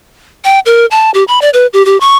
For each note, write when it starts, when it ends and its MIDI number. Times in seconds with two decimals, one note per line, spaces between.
0.45 0.59 79
0.66 0.86 70
0.91 1.11 81
1.14 1.24 67
1.28 1.39 83
1.42 1.50 74
1.54 1.67 71
1.73 1.85 67
1.85 1.99 67
2.00 2.17 85